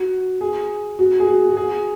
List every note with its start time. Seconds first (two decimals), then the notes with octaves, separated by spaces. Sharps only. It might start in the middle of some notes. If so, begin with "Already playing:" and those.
Already playing: F#4
0.41 G#4
0.99 F#4
1.20 G#4
1.27 F#4
1.50 F#4
1.57 G#4